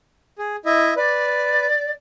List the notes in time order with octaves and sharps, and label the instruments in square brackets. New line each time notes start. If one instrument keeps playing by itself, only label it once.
[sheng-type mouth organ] G#4
E4 D#5 E5
[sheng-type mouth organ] B4 [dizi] D5